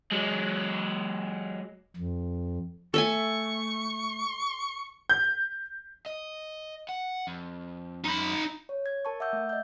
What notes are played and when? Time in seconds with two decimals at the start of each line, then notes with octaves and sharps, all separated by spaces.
0.11 F#3 G#3
1.96 F2
2.94 A3 A4 E5 G#5 C#6
5.09 G6
6.06 D#5
6.89 F#5
7.27 F2
8.04 F#2 D#4 B5
8.69 C#5
8.86 G#6
9.05 A#4 A5 C#6
9.20 E5 F#5 D6 E6 G6
9.33 A3 E5
9.49 D#5 G6